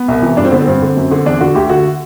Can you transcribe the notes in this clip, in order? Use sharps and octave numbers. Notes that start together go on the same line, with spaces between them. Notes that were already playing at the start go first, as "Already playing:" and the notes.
Already playing: B3
C2
C3 E3
G2 D4
C4
D3 B3
C4
G2
D3
F#2
D3
E2 D4
D3 F#4
D2 G4
D3 F#4